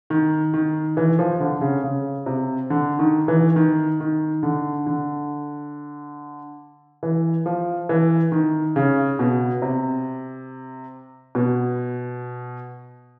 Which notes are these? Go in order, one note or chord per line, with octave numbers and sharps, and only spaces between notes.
D#3
D#3
E3
F3
D3
C#3
C#3
C3
D3
D#3
E3
D#3
D#3
D3
D3
E3
F3
E3
D#3
C#3
B2
C3
B2